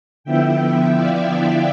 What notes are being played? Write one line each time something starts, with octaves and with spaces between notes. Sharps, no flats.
D3 F3 B3 E4 E5 G5
D5 F5